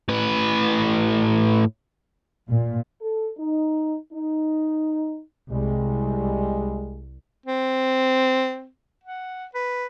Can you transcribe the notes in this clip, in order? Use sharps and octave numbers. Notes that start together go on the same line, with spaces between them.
A2 B4
A#2
A4
D#4
D#4
C2 G3 G#3
C4
F#5
B4